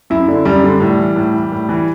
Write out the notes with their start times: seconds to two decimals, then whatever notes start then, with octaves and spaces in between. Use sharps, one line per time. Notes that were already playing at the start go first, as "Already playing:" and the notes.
0.10 F#2 E4
0.28 D3
0.45 F#2 G3
0.64 D3
0.80 A2
0.99 E3
1.16 A2
1.34 E3
1.52 A2
1.69 E3